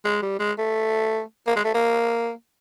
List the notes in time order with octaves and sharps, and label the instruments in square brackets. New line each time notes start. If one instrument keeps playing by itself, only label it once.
[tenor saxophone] G#3
G3
G#3
A3
A#3
G#3
A3
A#3